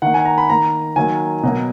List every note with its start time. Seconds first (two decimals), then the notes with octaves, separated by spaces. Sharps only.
0.02 D#3 A#3 F#5
0.14 G#5
0.25 A#5
0.38 B5
0.50 D#3 A#3 A#5
0.96 D#3 F#3 A#3 G#5
1.43 B2 F#3 A#3